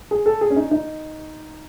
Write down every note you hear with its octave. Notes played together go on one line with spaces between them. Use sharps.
G#4
A4
G#4
C#4
D#4
D#4